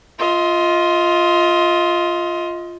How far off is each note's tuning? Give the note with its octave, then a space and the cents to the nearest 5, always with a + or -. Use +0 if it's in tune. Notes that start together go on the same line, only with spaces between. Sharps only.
F4 +0 D#5 +30